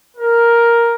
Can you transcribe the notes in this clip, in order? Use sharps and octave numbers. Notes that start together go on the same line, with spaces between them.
A#4